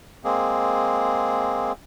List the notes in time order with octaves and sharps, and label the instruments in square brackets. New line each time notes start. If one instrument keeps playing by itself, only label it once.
[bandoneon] G#3 A#3 C4 G#4